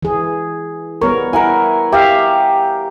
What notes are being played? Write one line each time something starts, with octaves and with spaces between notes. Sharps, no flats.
E3 G#4
G3 B3 A#4 C#5
E4 A#4 F#5 G#5
G4 E5 F5